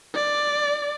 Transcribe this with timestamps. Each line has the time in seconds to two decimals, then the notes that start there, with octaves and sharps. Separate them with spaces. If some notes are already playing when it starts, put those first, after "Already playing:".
0.15 D5